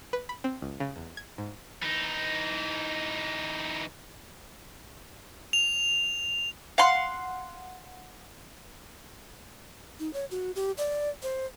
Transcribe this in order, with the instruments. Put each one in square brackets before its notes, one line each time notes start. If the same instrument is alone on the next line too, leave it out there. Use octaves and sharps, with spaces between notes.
[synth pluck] B4
B5
C4
C#2
C#3
E2
G#6
G#2
[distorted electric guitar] E3 D#4
[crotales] F7
[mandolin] F5 F#5 C6
[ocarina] D#4
C#5
F#4
G4
D5
C5